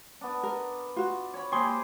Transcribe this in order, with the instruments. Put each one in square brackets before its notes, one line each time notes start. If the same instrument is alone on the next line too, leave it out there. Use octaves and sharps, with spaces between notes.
[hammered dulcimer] B3 D4
[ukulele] A#4
F4 F#4
[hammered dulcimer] C#5 B5
[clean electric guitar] A#3 C6 [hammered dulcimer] G4 G#4 C5